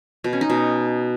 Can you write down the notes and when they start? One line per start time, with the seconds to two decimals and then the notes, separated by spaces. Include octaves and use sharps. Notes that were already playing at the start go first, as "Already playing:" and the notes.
0.24 B2
0.33 C#4
0.41 D#4
0.50 B2